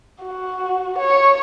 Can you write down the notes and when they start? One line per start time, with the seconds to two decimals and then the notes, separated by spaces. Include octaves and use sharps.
0.24 F#4
0.98 C#5